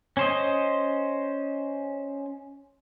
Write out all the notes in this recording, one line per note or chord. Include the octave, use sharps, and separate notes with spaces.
C#4 C5 D#5